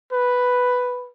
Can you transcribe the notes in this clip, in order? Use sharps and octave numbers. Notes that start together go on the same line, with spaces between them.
B4